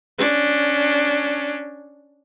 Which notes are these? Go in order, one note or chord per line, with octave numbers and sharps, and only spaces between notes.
C#4 D4